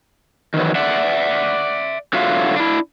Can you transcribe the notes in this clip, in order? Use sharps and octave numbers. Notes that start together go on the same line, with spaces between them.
D#3 E3 F#3
D5 E5 F#5
D3 F#3 F4 F#4 E5 F5
D4 E4